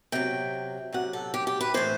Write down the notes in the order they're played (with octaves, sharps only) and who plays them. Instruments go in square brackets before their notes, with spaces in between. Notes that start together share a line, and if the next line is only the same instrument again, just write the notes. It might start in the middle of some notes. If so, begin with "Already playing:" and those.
[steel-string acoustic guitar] C3 F#3 G5
C3 F#3 F#5
A4
G4
G4
B4
A2 E3 C5